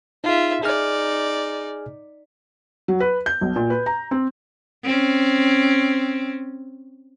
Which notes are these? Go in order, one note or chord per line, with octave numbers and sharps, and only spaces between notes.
D#4 F4 G#4 E5
D#4 G#4 D5 G#5 F6
F#3
B4
G6
B1
A#2
B4
A#5
C4
C4 C#4